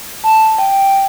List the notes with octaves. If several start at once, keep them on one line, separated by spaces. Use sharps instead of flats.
A5
G5